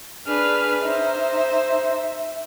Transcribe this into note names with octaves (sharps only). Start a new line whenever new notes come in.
D4 G#4 B4 F6
D#4 C5 E5